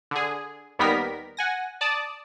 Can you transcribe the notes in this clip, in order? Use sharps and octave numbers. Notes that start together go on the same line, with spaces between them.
D3 G#4
D#2 D#3 G3 B3 A#4 B6
F#5 G#5 A#6
D5 A5 D#6